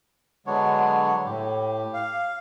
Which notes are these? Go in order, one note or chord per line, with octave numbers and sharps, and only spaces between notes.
D3 F#3 G#3 B3 D4 C#5
A2 G4
F5